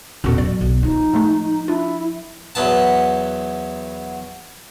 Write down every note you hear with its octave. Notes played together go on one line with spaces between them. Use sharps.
E2 A2 C#4 F#4 A4
F#3 D5
B1
F3 D#4
A2 G#3 A3
D4 E4 F4
E2 F#3 B3 A5